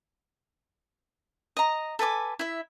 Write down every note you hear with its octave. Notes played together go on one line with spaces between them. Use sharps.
D#5 A#5
A4 B4 G#5 D6
E4 E5